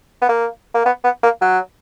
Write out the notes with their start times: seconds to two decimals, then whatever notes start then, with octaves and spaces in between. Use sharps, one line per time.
0.22 B3
0.29 A#3
0.74 A#3
0.85 B3
1.04 B3
1.23 A#3
1.41 F#3